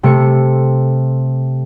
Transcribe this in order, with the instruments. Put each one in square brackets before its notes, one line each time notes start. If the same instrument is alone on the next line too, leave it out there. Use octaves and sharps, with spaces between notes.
[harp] C3 A3 C#7